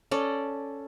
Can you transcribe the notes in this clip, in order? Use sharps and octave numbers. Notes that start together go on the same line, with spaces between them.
C#4 A4 D5